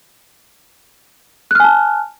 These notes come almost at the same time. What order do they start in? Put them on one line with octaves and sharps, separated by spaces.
F#6 F6 G#5 A5